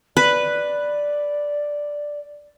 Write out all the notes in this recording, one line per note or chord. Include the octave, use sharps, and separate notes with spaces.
B4 D5